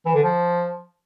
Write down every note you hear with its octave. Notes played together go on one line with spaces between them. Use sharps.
E3
D3
F3